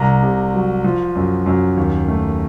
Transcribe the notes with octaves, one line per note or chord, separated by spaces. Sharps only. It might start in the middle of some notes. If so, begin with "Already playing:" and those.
Already playing: C2 A#5
C3
F#3
F3
F#2
F#2
D#2
A3